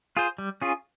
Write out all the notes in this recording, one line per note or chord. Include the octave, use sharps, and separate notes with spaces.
F4 G#4 C5
G3
C#4 F4 G#4